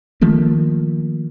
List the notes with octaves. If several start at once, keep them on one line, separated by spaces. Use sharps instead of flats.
D#3 F3 A3 A#3